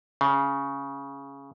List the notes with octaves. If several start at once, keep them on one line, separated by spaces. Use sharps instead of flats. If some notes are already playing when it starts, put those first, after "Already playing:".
C#3